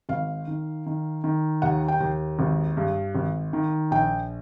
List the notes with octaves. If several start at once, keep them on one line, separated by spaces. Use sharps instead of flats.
G#1 F5
D#3
D#3
D#3
D#2 F#5
G5
D#2
G#1
G2
G#1
D#3
A#1 G5